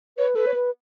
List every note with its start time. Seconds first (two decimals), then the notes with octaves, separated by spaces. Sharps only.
0.17 B4 C#5
0.35 A4 B4
0.46 C#5
0.54 B4